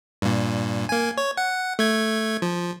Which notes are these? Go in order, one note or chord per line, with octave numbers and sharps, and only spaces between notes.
G2 A#2
A#3 G#5
C#5
F#5
A3 G#6
F3